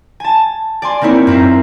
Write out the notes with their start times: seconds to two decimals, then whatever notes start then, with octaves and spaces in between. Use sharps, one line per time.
0.20 G#5 A5
0.82 D5 G#5 C6
1.01 A#3 C4 D#4 E4 C#5
1.27 F#2 C4 E5 C7